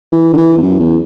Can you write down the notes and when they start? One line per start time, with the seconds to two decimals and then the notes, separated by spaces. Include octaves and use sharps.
0.12 E3
0.33 D3
0.37 E3
0.58 E2
0.62 F#2
0.80 E2